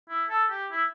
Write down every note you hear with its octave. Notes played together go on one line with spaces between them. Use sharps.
E4
A4
G4
E4